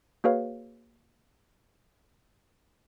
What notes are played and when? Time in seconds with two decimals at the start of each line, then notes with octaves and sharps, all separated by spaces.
0.24 A#3 F#4 G#4 B4 C#5 F5